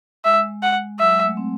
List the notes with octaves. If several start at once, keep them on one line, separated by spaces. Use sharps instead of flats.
G#3 E5
F#5
F#3 E5
G#3
A3
C4